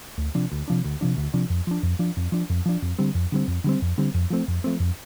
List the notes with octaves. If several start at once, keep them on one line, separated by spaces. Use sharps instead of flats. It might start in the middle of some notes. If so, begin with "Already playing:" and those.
D2
C3 F3 D4
D2
C3 F3 D4
D2
C3 F3 D4
D2
C3 F3 D4
F2
F3 D4
F2
F3 D4
F2
F3 D4
F2
F3 D4
F2
D3 G3 C4
F2
D3 G3 C4
F2
D3 G3 C4
F2
D3 G3 C4
F2
F3 A3 C4
F2
F3 A3 C4
F2